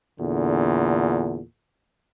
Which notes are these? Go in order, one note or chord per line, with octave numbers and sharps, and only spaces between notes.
E2 A#2 D3